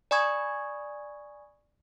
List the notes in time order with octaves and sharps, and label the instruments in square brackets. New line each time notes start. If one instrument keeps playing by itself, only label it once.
[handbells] D5 G#5 B5 C#6 D#6 G#6